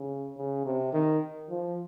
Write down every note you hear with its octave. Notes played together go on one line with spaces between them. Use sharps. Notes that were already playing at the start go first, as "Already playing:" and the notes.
Already playing: C#3
C#3
C3
D#3
F3